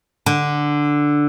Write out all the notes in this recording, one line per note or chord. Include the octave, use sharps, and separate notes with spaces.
D3